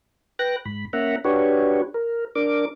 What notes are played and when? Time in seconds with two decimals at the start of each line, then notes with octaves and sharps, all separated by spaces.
0.39 B4 G5 F#6 A#6
0.65 G#2 B5
0.93 A#3 C#4 E5 F#5 A#5
1.25 D4 F#4 G4 B4 C#5
1.94 A#4
2.35 D4 A#4 D6